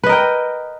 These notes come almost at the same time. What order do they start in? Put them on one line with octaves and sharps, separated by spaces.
B4 D#5 A#4 G5